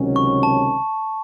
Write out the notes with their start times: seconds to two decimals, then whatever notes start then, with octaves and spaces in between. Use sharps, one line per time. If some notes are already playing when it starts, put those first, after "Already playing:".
Already playing: C#2 C3 D#3 F#3 C#4
0.16 C#6
0.43 A5